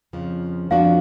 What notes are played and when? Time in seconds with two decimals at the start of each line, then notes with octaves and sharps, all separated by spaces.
0.13 F2 C#3 F3
0.70 F2 F3 B3 D4 F#4 F5
0.85 F5